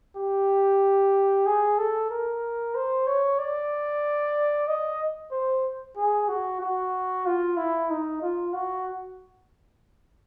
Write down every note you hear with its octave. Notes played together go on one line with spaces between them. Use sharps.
G4
G#4
A4
A#4
C5
C#5
D5
D#5
C5
G#4
F#4
F#4
F4
E4
D#4
F4
F#4